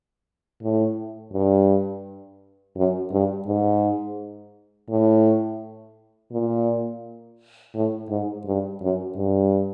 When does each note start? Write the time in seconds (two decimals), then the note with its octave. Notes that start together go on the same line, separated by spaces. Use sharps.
0.62 A2
1.33 G2
2.76 F#2
3.12 G2
3.47 G#2
4.90 A2
6.32 A#2
7.75 A2
8.10 G#2
8.46 G2
8.82 F#2
9.17 G2